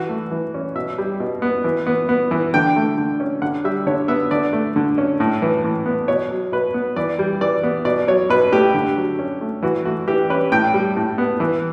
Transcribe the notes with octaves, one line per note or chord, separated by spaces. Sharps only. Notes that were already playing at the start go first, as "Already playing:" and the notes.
Already playing: E3 F#4
A3
E3
C#4
B2 E5
G3
B2
B3
E3
B3
B3
E3
D3 G5
A3
D3
C#4
D3 F#5
G3 E5
D3 C#5
B3 E5
D3 D5
A3
D3
C#4
A2
E3
A2
B3
B2 C#5
F#3
B2 B4
B3
E3 D5
G3
E3 D5
B3
B2 D5
F#3 C#5
B2 B4
A3 G4
D3
F#3
C#4
A3
E3 F#4
A3 F#4
E3 G4
C#4 B4
A2 G5
G3
A2
B3
E3